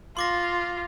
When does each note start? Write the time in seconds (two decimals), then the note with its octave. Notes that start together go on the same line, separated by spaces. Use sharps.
0.17 F4 C6 D6 A#6